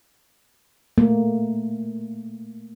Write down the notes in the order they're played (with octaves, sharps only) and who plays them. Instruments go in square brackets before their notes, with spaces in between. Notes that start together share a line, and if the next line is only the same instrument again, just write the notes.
[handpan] A3 A#3